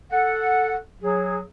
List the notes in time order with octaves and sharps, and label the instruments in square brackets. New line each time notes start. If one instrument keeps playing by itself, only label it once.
[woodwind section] A4 F#5
F#3 G#4